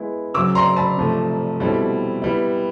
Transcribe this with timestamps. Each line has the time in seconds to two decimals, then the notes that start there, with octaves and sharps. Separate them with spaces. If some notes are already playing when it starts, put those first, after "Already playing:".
Already playing: G#3 B3 E4
0.34 C#3 F#3 A#3 D6 E6
0.55 A#5 C6
0.76 A5 B5
0.97 C3 F3 A3
1.59 B2 G3 C4 E4 A4
2.22 G3 B3 E4